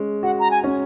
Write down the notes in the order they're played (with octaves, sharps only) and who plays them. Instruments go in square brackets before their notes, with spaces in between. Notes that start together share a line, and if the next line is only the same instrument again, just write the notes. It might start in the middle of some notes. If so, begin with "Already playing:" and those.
Already playing: [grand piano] G#3 C#4
[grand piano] F#4 [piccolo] F#5
[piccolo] A#5
G#5
[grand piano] C#4